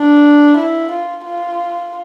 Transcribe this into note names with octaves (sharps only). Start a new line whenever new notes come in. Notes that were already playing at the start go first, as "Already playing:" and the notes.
Already playing: D4
E4
F4
F4